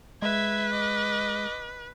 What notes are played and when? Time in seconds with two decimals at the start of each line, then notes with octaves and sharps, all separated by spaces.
0.22 G#3 B4 E5 G#6
0.72 D#5 D6